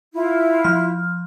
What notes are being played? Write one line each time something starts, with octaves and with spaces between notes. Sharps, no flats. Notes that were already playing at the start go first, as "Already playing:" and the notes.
E4 F4
F3 F6